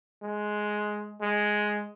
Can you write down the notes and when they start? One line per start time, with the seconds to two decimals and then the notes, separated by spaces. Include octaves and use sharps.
0.23 G#3
1.21 G#3